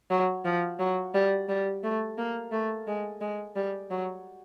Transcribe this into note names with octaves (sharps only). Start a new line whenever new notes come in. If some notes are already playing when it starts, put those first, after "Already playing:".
F#3
F3
F#3
G3
G3
A3
A#3
A3
G#3
G#3
G3
F#3